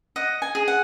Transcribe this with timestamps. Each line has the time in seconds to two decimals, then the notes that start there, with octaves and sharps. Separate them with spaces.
0.16 D#5 F#5
0.42 G#5
0.55 G#4
0.68 F#5